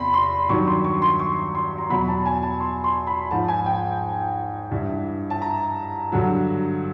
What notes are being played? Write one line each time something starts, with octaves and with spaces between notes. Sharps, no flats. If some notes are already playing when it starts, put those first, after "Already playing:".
Already playing: E2 C3 B5 C6
C6
G2 D#3 F#3 C#6
C6
C#6
C6
C#6
C6
A#5
E2 B2 F#3 B5
A5
G#5
A5
C6
C6
B5
G#2 F3 A5
G#5
G5
G2 E3
A5
A#5
G2 D3 F#3